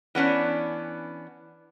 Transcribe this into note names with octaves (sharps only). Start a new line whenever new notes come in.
E3 B3 C#4 D4